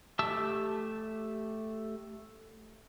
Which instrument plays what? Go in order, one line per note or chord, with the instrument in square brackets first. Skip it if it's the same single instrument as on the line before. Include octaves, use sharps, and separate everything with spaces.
[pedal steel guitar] A3 G4 E5 A5 E6